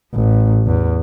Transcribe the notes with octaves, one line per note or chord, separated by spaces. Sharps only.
A1
E2